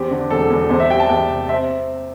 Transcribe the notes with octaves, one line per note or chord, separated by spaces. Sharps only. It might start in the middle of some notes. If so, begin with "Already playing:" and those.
Already playing: E2 C4 G4
D3
E1 A4
E2
E2 C5
E5
G3 G5
A5
E2 G5
C3
C4 E5